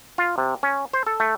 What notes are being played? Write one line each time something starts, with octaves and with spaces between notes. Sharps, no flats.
F4
C3
C#4
C5
A4
A3